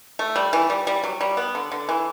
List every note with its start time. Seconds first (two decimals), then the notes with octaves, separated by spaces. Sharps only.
0.19 A3
0.36 G3
0.53 E3
0.70 G3
0.87 G3
1.04 F#3
1.21 G3
1.37 B3
1.55 D3
1.72 D3
1.89 E3